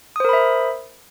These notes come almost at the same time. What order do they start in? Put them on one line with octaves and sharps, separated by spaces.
D#6 C5 A#4 B5 E5